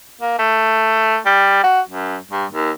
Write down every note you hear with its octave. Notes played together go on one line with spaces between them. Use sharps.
A#3
A3
G3
F#4
F#2
G2
D#2